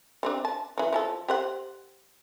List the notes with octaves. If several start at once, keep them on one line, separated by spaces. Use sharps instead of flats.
G3 C4 D4
A5
E3 F#3
F3 G4 A4
G4 C5 F#5